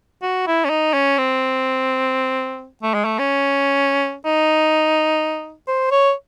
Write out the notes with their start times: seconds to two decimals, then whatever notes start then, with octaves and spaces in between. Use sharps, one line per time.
0.22 F#4
0.47 E4
0.65 C#4
0.69 D#4
0.93 C#4
1.18 C4
2.82 A3
2.94 G#3
3.04 A3
3.19 C#4
4.25 D#4
5.67 C5
5.91 C#5